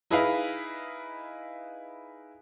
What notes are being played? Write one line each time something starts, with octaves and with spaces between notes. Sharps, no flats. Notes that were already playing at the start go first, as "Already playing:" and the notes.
D#4 E4 G#4 B4 D#5 F5